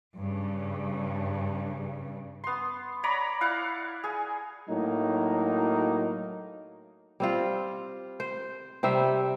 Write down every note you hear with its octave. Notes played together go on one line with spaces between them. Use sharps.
G2 C#3
B3 C6
C#5 D5 A#5 B5
E4 F5 F#5 D6
G#4 G#5
A2 F#3 A#3 D#4
G3 C4 F4
C5
C3 G3 C5 E5